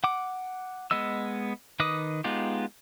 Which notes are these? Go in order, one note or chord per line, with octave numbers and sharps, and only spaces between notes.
F#5 D6
G#3 B3 D#5 E6
D#3 B4 D#5 D6 D#6
G#3 B3 D#4 F4 G4